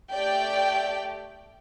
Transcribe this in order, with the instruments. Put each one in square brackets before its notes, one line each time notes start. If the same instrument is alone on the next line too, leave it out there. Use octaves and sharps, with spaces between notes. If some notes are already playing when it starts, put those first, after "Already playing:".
[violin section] A3 G4 D5 G5